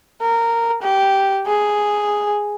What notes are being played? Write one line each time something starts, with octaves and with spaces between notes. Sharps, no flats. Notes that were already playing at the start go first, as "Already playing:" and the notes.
A#4
G4
G#4